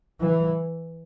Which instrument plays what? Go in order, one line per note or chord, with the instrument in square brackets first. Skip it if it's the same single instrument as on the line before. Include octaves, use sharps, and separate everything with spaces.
[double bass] E3